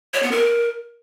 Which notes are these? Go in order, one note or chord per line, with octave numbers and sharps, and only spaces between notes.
C#5
B3
A#4